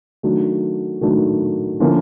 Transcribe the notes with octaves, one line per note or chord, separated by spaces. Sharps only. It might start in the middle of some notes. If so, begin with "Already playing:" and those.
D#3 F#3 A3 D4
D#3 F#3 A3 D4
D3 F3 A#3 C#4 E4